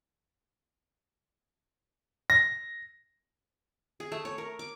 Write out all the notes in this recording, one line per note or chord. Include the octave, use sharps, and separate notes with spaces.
A#6
G#4
A3
C#5
A#4
D6